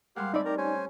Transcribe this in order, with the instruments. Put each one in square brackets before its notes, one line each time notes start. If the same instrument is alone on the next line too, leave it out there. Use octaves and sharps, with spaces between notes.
[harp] G#2 G3 C6 [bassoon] A#3 [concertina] G4 F5 F#5
[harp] A2 C4 [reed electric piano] D#4 D5 [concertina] E5 B5
[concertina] G4 A#5 [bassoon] A#4
[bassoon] C#4 [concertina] C5 G#5